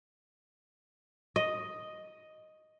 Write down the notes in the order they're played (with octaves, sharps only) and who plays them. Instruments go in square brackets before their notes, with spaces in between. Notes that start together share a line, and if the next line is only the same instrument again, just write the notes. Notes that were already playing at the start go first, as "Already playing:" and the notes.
[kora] D#5